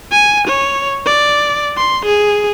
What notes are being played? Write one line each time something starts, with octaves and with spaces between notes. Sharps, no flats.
G#5
C#5
D5
C6
G#4